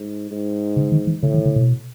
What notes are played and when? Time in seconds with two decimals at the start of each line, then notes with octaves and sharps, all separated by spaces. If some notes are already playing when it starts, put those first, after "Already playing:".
Already playing: G#2
0.31 G#2
0.77 C#3
0.92 D#3
1.07 E3
1.22 A2 C#3
1.34 D#3
1.46 C#3
1.56 B2